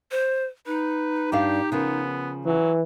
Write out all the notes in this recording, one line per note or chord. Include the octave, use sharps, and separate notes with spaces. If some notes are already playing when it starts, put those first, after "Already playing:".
C5
D#4 B4
G2 D4 G4 F5
C#3 F3 B3 A#4
E3 F#3